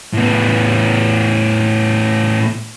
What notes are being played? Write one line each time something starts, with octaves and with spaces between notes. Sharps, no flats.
A2 B3